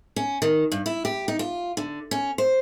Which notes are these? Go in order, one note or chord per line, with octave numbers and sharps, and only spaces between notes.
C#4
D#3
G2
E4
G4
D#4
F4
D3
C#4
C5